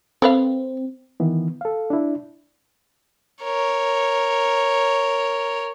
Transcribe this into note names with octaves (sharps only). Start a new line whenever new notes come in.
C4 A4 B4 F5
D#3 E3 B3
A4 F5
D4 E4
A#4 C#5